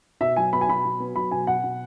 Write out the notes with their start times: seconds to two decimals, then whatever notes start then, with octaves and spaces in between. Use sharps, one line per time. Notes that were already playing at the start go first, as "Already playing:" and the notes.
0.21 B2 E5
0.36 F#3 G#5
0.53 B3 B5
0.61 G#5
0.69 B2 B5
0.85 F#3
1.00 B3
1.16 F#3 B5
1.31 B2 G#5
1.47 B2 F#5
1.64 B2